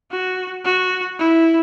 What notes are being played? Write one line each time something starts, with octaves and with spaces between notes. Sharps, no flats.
F#4
F#4
E4